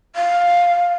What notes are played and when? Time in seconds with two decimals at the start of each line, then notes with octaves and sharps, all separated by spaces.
0.16 F5